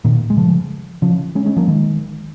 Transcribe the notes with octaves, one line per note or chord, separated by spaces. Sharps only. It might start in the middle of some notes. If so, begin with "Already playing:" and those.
A#2 D#3
G#3
C#3 F3
C#3 F3
G#3 C#4
G#3 C#4
F3 A#3
D#3 G#3